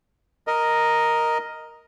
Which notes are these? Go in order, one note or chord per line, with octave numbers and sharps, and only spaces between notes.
A#4 D#5